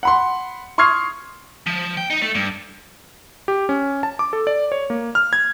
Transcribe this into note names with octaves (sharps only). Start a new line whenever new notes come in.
F#5 B5 C6
C6 C#6 D#6 F6 G#6 C7
F3
G5
D#4
A3
G2
G4
C#4
A5
D6
A4
D5
C#5
A#3
F6
G#6